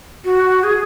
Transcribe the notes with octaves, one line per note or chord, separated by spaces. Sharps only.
F#4
G#4